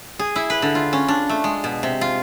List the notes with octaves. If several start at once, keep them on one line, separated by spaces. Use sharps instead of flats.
G#4
E4
B4
D3
F4
C#4
D4
A3
G#3
B2
C3
F4